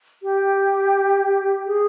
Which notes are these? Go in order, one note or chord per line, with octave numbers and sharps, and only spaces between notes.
G4
G#4